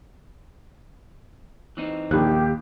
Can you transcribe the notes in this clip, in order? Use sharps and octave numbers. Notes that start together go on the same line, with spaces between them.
E3 C4 D#4
A#1 D#2 D#3 G4 F#6